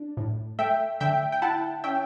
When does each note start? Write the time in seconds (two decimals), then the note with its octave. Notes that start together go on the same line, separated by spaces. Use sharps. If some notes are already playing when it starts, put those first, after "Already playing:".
Already playing: D4
0.17 A2
0.59 A3 E5 G5
1.00 D3 E5 G5
1.32 G5
1.42 E4 F#5 A5
1.84 C#4 E5 G5